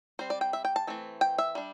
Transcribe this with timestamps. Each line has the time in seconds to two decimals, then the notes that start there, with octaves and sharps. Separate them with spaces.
0.19 G3 C4 C5
0.30 D5
0.41 G5
0.53 E5
0.65 G5
0.76 A5
0.87 E3 A3 C4
1.21 G5
1.38 E5
1.55 G3 D4